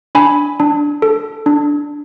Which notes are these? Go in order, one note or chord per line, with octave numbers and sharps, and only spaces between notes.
D4 G#5 B5
D4
A4
D4